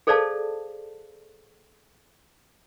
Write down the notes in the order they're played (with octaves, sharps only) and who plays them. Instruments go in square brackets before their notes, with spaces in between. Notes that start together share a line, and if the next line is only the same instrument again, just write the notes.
[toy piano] G#4 A4 C5 D5 F5 A5